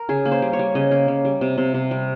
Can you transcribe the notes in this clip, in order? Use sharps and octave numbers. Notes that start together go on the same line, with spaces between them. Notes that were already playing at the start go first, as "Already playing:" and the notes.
Already playing: A#4
C#3 G#4
A#3
C5
G3
C#5
G3
C#3 D#5
A#3
C#3
G3
C3
C3
C3
G3